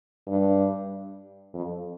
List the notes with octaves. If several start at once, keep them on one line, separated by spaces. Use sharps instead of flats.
G2
F2